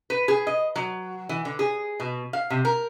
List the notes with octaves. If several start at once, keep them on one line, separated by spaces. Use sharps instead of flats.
B4
G#4
D#5
F#3
E3
D3
G#4
B2
F5
C3
A#4